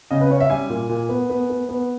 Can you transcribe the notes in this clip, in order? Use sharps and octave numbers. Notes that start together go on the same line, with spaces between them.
C#3 D#5
B4
C#4 C#5
E5
G3 G#5
A#2
A#2
B3
B3
B3
B3